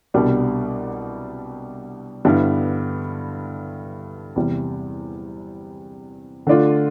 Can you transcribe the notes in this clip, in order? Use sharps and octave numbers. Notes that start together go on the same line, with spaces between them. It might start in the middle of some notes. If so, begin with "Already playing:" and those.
C2 B2 G3 D4
G2 D3 G3 B3 E4
E2 C3 G3
D3 A3 D4 F4